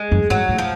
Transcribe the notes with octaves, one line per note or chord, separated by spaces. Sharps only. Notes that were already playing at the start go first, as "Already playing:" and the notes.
Already playing: G#3
F#2
G#2 F#3
A2
F3